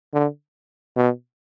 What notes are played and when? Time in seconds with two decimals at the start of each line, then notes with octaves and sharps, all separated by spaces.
0.13 D3
0.96 B2